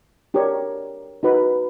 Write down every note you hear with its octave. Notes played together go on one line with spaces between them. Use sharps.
D4 G4 A#4 C#5
D#4 F#4 B4